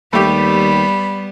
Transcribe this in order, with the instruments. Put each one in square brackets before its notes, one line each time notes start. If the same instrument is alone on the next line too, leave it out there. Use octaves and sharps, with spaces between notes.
[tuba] D#2 [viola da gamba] G3 B3 [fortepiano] A3 G4 [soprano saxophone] B5